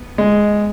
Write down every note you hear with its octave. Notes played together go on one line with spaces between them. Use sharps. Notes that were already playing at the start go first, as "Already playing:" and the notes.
Already playing: B3
G#3